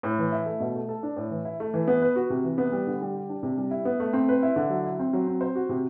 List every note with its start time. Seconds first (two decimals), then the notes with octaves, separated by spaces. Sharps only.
0.03 A2
0.18 E3
0.32 E4
0.46 A3
0.60 B2
0.75 A3
0.89 A4
1.03 D4
1.16 A2
1.31 E3
1.45 E4
1.60 A3
1.74 E3
1.88 B3
2.02 B4
2.16 F#4
2.30 C3
2.44 E3
2.58 B3
2.72 G3
2.87 D3
3.01 G3
3.15 G4
3.29 D4
3.43 C3
3.57 G3
3.71 E4
3.85 B3
4.00 A3
4.13 C4
4.29 B4
4.43 E4
4.56 D3
4.70 F#3
4.84 E4
4.99 C4
5.13 F#3
5.27 C4
5.41 C5
5.56 F#4
5.69 C3